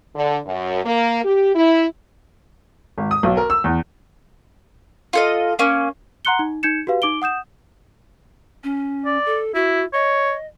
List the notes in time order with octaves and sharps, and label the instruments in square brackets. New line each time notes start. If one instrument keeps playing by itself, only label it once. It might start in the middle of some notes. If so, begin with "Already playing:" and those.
[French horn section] D3
F#2
A#3
G4
E4
[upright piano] G#1
D#6
B1
A#4
E6
E2
[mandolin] F4 A4 D#5
A#3 C#4
[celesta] F#5 A#5 C6 F#6 C#7 G7
D#4
D#4 G6 G#6 C#7 E7
F#4 G4 B4 F5
D#4 D6 D7 G7
F#5 D#6 G6 E7
[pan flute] C#4
[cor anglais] D5
[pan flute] A4
[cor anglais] E4 [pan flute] F#4
[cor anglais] C#5 [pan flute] D#5